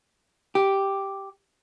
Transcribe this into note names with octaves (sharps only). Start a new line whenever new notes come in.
G4